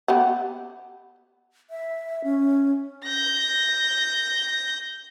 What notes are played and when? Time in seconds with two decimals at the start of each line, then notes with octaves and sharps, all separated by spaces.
0.08 B3 G4 F#5
1.70 E5
2.24 C#4
3.04 G6 A#6